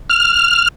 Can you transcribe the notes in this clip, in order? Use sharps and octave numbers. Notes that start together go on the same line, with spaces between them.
F6